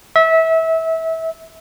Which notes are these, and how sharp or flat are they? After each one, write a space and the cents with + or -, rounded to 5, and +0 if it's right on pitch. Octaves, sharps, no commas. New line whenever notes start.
E5 -25